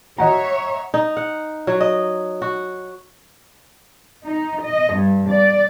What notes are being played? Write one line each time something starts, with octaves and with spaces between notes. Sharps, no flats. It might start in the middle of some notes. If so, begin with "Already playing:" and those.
C#5 D#5 E5 F#5 A#5
D#4
F#5
F#3
D#5
F#4
D#4
D#5
G2
D5